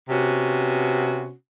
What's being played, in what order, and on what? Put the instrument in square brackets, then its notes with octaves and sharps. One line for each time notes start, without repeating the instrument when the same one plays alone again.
[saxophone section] C3 B3 C#4 F#4